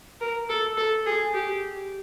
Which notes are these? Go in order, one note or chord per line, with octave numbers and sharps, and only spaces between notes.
A#4
A4
A4
G#4
G4